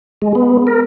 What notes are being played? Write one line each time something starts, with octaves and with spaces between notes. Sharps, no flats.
G#3
B3
A#4